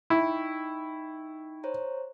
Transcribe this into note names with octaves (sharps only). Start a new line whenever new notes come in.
D#4 E4 G5 C#6
C5 C#5 A#5